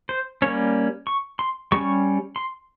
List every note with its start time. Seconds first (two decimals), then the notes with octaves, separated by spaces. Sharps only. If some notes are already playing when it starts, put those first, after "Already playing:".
0.09 C5
0.42 G3 A#3 C#4 C#5
1.07 C#6
1.39 C6
1.72 G3 C#4 C#6
2.36 C6